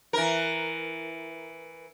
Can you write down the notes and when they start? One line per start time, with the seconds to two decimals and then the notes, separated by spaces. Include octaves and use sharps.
0.13 E3 A#4